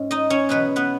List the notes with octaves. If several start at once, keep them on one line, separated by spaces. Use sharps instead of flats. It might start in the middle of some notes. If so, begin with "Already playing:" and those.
Already playing: G#2 C#4
D#4 D#5
C#4 C#5
E2 B2 F#3 B3 B4
B3 B4